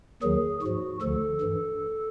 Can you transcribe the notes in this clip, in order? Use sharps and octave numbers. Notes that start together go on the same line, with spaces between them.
D#2 D#3 F#3 G#4
G#2 F3 F#4
D2 D3 F3 A4
G2 E3